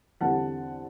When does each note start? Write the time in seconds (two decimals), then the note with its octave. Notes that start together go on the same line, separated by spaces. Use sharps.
0.21 E2 D3 G3 C4 F#5 A5